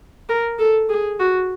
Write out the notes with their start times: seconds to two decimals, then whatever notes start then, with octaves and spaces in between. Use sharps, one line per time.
0.29 A#4
0.59 A4
0.89 G#4
1.20 F#4